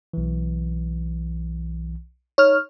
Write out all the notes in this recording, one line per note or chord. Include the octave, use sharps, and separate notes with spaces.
B1 E3
D#4 C#5 F6